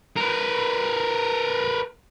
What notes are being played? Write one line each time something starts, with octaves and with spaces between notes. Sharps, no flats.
A#4 B4